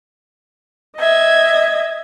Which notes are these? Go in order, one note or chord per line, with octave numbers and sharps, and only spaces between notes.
D#5 E5 G#6